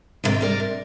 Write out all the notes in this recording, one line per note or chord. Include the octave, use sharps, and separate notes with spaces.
D#2 G#2 C3 D#3 G5
G3 A#4 D5
C3